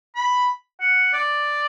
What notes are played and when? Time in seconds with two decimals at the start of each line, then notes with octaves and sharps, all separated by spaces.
0.15 B5
0.80 F#5
1.13 D5